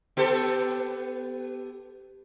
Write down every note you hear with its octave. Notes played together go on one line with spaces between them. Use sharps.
B3 G4 A4